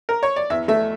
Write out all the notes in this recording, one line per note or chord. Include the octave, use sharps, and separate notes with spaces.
A#4
C#5
D5
E2 E5
A3 E5